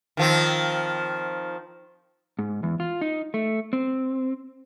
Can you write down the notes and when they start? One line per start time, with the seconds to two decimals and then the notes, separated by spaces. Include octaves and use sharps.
0.17 D#3 F3 C4
2.39 G#2
2.63 E2
2.80 F4
3.01 D#4
3.34 A3
3.73 C4